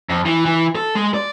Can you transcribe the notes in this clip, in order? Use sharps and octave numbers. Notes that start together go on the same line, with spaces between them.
F2
E3
E3
A4
G#3
D5